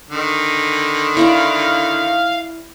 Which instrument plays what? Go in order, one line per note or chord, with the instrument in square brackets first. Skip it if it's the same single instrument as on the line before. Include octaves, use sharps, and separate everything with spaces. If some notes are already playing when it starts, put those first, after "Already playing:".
[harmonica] D3 D#3
[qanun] E4 C#5 D5 [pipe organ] F5